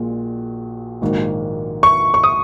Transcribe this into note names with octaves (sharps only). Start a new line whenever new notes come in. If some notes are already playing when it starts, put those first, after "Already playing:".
Already playing: A#1 A#2 G#3 F#4
A#1 G#2 D#3 A#3 F#4
C#6
C#6
D#6